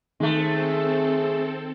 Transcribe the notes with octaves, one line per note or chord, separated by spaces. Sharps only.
D#3 G#3 A3 C4 A4